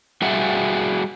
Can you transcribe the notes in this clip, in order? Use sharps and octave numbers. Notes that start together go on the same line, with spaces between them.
G3 F#4 G#4 E5 F#5